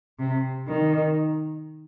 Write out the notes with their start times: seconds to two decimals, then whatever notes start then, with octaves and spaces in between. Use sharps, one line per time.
0.19 C3
0.67 D#3